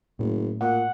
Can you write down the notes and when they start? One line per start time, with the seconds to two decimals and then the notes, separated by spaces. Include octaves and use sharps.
0.19 F#1 A2
0.61 A#2 F#5